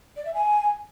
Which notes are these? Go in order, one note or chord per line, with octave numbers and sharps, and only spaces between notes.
D5
E5
G#5